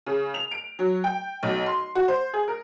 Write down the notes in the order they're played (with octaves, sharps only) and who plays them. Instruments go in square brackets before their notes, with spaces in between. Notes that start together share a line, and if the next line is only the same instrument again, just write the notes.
[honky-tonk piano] C#3
F7
D7
F#3
G5
B1
C6
F#4
C5
G#4
A#4